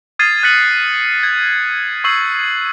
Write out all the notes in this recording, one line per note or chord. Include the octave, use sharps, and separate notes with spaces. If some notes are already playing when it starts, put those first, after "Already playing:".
D#6 F6 G#6 A6 C7 D#7
F#6 G#6 A6 B6 C#7 F#7
G#6
C#6 E6 G6 C7 F#7